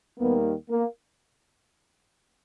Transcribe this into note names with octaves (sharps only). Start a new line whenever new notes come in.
D#2 D#3 G3 A#3 B3
A#3